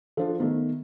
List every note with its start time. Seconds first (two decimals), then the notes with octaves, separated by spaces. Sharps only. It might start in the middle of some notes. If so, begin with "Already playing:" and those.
0.17 F3 D4 F4 A4 C5
0.40 D#3 A3 B3